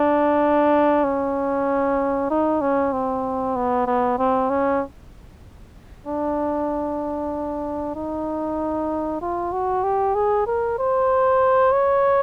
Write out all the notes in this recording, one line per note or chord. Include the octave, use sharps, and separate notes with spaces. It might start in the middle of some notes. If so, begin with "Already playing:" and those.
Already playing: D4
C#4
D#4
C#4
C4
B3
B3
C4
C#4
D4
D#4
F4
F#4
G4
G#4
A#4
C5
C#5